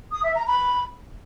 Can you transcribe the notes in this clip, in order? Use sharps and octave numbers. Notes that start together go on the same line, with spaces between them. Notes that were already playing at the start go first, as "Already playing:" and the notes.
D#6
E5
A#5
B5